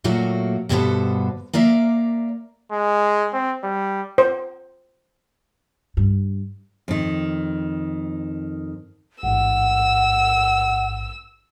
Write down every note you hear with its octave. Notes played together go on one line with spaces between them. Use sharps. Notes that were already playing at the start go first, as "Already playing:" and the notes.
A#2 F#3 A3 A#3 F#4
G2 B2 D3 B3 A4 C5
A#3 A#4 D5 E5 F5
G#3
C4
G3
C5
G2
F2 D#3
A1 G#2 F#5 E6